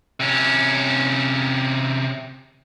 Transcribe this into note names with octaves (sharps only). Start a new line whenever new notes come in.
C3 C#4